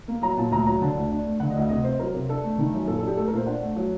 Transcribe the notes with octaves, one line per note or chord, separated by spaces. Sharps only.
A#3
F#3 A#5
A#2 A5
D2 A#5
F#3 A#5
D3 A5
D2
D4
A3
D3 F#5
D#5
D2 F#5
C3 D#5
C4 C5
F#3 A#4
C3
D4 A4
A3
D#3
F#2
A#2 A4
D4 A4
G4
A3 A4
A#4
A#2 C5
D4 F#5
A3
F#3